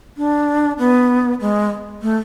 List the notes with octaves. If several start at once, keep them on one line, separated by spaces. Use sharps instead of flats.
D4
B3
G#3
A3